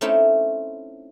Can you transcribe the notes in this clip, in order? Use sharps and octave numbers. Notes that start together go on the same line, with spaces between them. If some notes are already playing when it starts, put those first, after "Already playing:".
A3 C4 C#4 D#4 E4